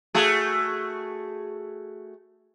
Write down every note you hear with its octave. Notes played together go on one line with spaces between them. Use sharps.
A3 F#4 G#4